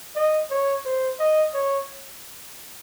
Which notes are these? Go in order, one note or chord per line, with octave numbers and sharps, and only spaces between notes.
D#5
C#5
C5
D#5
C#5